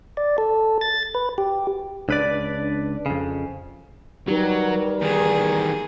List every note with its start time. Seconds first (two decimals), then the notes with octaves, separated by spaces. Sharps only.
0.17 D5
0.38 A4
0.81 A6
1.15 B4
1.38 G4
2.09 C#2 D4 B4 D5
3.06 F2 C#3
4.28 F#3 G3 D#4 G4 A#4 B4
5.02 E2 D#3 G#4